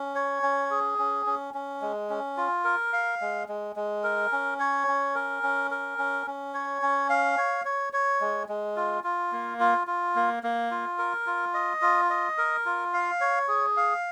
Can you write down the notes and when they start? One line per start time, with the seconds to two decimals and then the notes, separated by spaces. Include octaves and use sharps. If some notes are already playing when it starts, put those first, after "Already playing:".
Already playing: C#4
0.15 C#5
0.43 C#4
0.71 G#4
0.99 C#4
1.26 C#4
1.54 C#4
1.82 G#3
2.10 C#4
2.37 F4
2.64 A#4
2.93 F5
3.21 G#3
3.49 G#3
3.76 G#3
4.04 A#4
4.32 C#4
4.59 C#5
4.88 C#4
5.15 A#4
5.43 C#4
5.71 A#4
5.98 C#4
6.26 C#4
6.54 C#5
6.82 C#4
7.10 F5
7.37 C#5
7.65 C#5
7.93 C#5
8.21 G#3
8.49 G#3
8.76 F4
9.04 F4
9.32 A#3
9.60 F4
9.87 F4
10.16 A#3
10.43 A#3
10.71 F4
10.98 A#4
11.26 F4
11.54 D#5
11.82 F4
12.10 D#5
12.38 A#4
12.66 F4
12.93 F5
13.21 C#5
13.48 G#4
13.77 F5